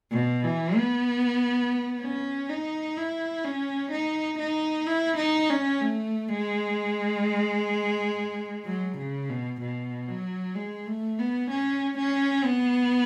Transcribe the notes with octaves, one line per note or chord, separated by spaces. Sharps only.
B2
E3
B3
C#4
D#4
E4
C#4
D#4
D#4
E4
D#4
C#4
A3
G#3
F#3
C#3
B2
B2
F#3
G#3
A3
B3
C#4
C#4
B3